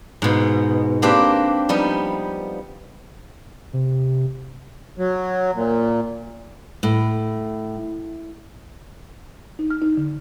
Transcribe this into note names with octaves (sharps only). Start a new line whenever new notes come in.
G#2 B2
A#3 C4 D4 G4 B4
F3 G3 B3 D#4
C3
F#3
A#2
A2
D#4
F6
D#4
D3